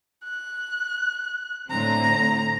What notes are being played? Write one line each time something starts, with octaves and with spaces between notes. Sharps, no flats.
F#6
A2 D3 C4 A#5